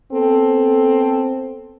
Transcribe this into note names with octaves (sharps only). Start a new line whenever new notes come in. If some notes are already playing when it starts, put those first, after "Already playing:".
B3 C4 A4